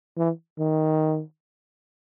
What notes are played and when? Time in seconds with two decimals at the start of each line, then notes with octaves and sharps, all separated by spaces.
0.17 E3
0.59 D#3